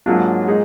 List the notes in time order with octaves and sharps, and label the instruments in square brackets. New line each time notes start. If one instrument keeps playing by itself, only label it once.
[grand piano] G#2 F#3 A#3 D4 [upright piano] F4
[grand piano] A#2 G#3 D#4 G#4